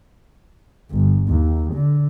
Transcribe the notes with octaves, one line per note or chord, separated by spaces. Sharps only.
G1
D#2
D3